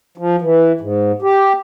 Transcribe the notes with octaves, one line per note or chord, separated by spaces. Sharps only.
F3
E3
G#2
G4